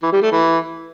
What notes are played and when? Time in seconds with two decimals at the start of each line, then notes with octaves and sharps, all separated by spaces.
0.02 E3
0.12 G3
0.22 A3
0.32 E3